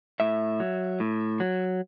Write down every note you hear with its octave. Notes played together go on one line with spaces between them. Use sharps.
A2 E5
F#3
A2
F#3